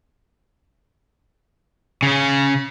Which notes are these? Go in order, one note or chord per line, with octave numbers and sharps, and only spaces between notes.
C#3 C#4